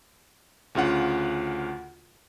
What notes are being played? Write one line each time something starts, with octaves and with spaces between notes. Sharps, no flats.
D2 C#3 F4 F#5